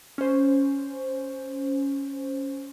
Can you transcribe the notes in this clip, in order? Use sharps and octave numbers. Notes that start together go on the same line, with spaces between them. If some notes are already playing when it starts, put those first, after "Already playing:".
C#4 C5